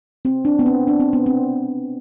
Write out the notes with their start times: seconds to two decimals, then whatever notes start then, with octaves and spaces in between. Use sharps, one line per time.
0.25 C4
0.45 D4
0.59 B3
0.66 C4
0.88 D4
1.00 C4
1.13 B3
1.26 C4